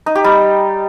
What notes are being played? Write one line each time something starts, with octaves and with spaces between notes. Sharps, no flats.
D#4
G4
G3